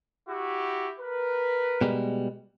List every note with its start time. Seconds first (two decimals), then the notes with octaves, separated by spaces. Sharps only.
0.28 E4 F#4 G4
0.98 A#4 B4
1.81 B2 G3 G#3